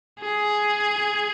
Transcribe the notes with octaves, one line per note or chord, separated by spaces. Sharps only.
G#4